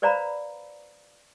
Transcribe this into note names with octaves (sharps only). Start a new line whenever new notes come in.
B4 C5 D5 F5 A#5 B5